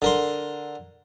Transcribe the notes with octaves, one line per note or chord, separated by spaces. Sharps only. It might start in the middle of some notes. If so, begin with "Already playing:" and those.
D3 A#4 C6